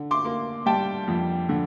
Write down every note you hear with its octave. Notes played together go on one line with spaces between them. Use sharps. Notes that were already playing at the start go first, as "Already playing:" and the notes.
Already playing: D3
C6 D6
A#3
G3 G5 A5
F2
D3